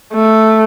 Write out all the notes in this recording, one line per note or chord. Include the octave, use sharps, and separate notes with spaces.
A3